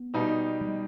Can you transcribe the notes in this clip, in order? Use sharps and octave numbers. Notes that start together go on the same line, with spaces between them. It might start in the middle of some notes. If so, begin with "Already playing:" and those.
Already playing: B3
B2 G3 D#4
G3